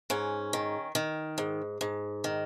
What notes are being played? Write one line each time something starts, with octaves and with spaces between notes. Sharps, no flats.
G#2 C#4
D#3
D#3
G#2
G#2
D#3